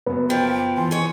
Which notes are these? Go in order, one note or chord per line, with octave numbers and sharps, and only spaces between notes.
F#1 F#2 B3
F3 G5
E3 C6
G#4 C#5